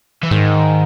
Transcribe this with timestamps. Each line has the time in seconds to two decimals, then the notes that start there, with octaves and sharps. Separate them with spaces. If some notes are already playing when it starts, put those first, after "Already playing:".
0.23 E3
0.31 G#2 D#3